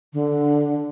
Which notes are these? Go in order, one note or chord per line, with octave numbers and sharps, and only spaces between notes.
D3